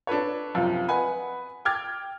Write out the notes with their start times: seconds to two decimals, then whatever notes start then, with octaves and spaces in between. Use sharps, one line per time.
0.07 D4 A4 B4 C#5
0.54 C#2 F#2 C3 F3 F5
0.88 B4 D#5 F#5 G#5 B5
1.65 G5 D6 F6 G#6 A6